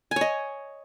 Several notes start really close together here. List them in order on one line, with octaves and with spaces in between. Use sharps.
G#5 C#5 D#5